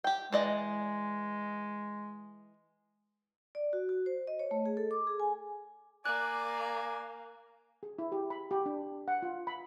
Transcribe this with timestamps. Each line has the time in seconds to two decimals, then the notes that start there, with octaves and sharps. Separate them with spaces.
0.04 G4 G5
0.33 E3 G#3 D5 D#5
3.55 D5
3.73 F#4
3.89 F#4
4.06 C5
4.27 D#5
4.39 C#5
4.51 A3
4.66 G#4
4.77 A4
4.91 D6
5.07 G#4
5.20 G#5
6.05 A#3 D5 G#5 F#6
7.83 G#4
7.99 E4
8.12 G4
8.30 B5
8.51 G4
8.66 D4
9.08 F#5
9.22 F4
9.47 B5